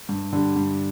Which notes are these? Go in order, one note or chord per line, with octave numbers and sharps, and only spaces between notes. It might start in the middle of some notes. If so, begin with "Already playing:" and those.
G2
D3 G3
G2